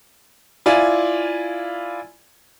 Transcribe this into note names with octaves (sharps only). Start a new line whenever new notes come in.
E4 F4 D5 G#5